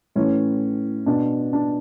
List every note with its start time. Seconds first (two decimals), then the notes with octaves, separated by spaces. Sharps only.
0.16 A2 E3 C#4
1.06 B2 D4
1.53 D4